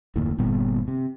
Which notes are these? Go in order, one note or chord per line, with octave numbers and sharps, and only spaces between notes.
F#1 D#2 A2
G1 A#2 G3 B3
C3